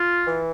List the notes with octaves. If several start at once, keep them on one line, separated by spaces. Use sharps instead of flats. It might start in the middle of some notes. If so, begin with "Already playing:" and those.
Already playing: F4
E3